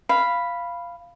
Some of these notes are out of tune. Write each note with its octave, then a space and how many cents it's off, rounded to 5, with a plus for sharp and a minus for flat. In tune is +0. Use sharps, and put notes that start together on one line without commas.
F5 -10 B5 +0